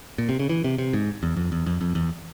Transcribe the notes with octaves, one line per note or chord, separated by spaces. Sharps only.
A#2
C3
C#3
E3
C3
C3
G#2
E2
F2
E2
F2
F2
E2